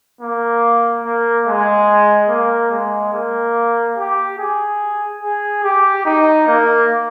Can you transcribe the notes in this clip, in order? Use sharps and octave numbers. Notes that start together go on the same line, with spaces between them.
A#3
A#3
G#3
A#3
G#3
A#3
G4
G#4
G#4
G4
D#4
A#3